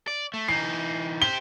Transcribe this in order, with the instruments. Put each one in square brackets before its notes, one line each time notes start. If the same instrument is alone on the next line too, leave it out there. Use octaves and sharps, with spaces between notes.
[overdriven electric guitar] D5
A3
[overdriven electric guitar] E3 D#4 [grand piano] C7
[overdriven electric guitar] G4 C5 [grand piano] G7